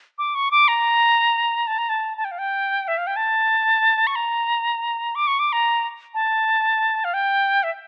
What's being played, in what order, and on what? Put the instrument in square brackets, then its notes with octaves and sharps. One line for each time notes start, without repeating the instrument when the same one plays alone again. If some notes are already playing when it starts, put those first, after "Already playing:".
[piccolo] D6
C#6
D6
A#5
A5
A#5
A5
A5
G5
F5
G5
E5
F5
G5
A5
C#6
A#5
D6
C#6
D6
A#5
A5
F5
G5
E5